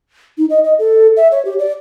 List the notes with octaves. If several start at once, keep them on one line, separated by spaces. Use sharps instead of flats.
D#4
D#5
D#5
A4
E5
C#5
G4
D5